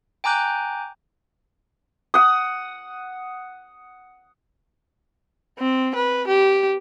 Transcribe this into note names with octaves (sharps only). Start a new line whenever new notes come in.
G5 G#5 A#5 D6 F#6 G6
F#5 D#6
C4
B4
G4